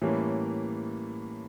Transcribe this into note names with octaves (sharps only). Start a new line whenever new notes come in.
A2 E3 G3 A#3 C#4